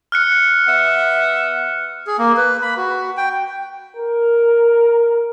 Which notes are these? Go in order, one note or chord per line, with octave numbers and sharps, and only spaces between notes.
F6 F#6 C#7
B3 E5
G#4
A#3
B4
B5
F#4
G5
A#4